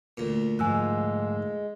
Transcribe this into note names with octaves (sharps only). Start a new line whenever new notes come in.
D2 A#2
G#2 F3 G#3 G#5 E6 F#6